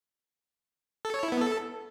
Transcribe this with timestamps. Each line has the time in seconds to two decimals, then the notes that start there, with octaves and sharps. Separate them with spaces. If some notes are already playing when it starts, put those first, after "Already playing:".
1.05 A4
1.14 C#5
1.23 E4
1.32 B3
1.41 A4